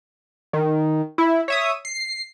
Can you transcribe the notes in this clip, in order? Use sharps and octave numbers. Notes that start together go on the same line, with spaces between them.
D#3
E4
C#5 E5 D#6
C7